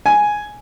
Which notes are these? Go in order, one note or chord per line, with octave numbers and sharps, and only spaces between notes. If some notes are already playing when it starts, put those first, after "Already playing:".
G#5